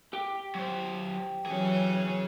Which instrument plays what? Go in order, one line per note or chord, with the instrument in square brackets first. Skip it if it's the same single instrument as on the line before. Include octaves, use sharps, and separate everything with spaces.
[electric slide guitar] G4 G5
[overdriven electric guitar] F#3 C5
[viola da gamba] E3 F#3 C#4 [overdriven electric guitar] G#4 C#5